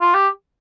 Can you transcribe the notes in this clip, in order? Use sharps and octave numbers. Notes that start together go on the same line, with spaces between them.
F4
G4